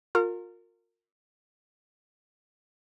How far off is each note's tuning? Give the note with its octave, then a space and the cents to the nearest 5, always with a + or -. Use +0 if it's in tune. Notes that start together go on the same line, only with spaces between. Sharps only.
F4 +30 A#4 -25